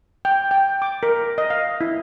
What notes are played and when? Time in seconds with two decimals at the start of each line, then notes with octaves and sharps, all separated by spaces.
0.25 G5
0.51 G5
0.82 D6
1.03 A#4
1.38 D#5
1.50 F5
1.81 E4